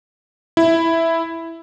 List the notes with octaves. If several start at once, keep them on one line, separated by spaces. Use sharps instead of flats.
E4